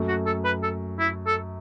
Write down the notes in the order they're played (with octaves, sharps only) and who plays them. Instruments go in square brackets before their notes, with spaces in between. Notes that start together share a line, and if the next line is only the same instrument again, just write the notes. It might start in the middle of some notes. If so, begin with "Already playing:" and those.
Already playing: [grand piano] F#2 F#3 A3
[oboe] F#4
A4
B4
A4
E4
A4